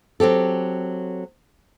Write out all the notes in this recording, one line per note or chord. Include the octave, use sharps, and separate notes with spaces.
F#3 C4 G4 A4